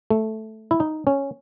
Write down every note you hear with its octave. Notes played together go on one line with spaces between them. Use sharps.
A3
E4
D#4
C#4